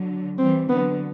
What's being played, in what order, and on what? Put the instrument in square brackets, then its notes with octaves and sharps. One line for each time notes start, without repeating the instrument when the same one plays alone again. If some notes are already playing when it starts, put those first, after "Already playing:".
Already playing: [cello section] D3 F#3
[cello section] E3 G3 [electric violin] C4
[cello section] D3 F#3 [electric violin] B3